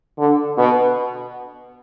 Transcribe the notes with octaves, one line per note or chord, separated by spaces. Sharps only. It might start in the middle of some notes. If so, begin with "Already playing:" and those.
D3
B2